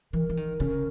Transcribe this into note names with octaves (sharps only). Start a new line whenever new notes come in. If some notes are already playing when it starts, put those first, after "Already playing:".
E3 A#4
E3
D#3
C#3